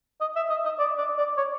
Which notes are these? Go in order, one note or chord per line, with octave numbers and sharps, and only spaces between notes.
D#5
E5
D#5
D#5
D5
D5
D5
C#5